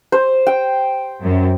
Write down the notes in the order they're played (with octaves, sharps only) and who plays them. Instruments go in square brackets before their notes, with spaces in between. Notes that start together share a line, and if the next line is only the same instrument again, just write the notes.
[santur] C5
G5
[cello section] F#2